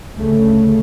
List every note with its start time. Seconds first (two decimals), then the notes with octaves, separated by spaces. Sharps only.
0.15 D2 C#3 A3